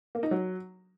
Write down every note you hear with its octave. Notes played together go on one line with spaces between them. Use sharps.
A#3
D#4
F#3